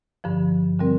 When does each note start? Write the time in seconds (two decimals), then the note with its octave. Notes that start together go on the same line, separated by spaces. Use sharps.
0.24 G2 D3 F3
0.79 D3 G3 C4 A#4